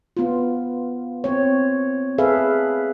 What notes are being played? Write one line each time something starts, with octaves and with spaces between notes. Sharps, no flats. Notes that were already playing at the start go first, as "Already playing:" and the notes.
B3 F4
C4 C#5
G#4 A4 B4 E5 F5